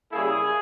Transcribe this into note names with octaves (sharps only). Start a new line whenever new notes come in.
C#3 G3 A#3 E4 G#4